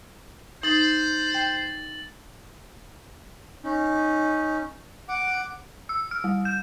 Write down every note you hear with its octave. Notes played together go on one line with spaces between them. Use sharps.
D#4 C5 A6 F#7
G5
C#4 D#4
F#5 D6
E6
F6
G3
G6